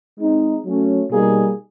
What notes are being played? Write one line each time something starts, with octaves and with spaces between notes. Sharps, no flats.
G#3 C4 D#4
F#3 A3 C#4
B2 G3 A#3 D#4 G#4